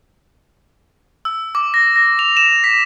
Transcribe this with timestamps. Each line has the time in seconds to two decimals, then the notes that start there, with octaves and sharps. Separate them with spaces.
1.25 E6
1.55 D6
1.74 A#6
1.96 A#6
2.19 F7
2.37 E7
2.64 B6